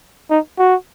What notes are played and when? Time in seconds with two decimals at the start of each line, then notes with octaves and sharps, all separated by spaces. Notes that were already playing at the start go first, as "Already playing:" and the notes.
0.30 D#4
0.58 F#4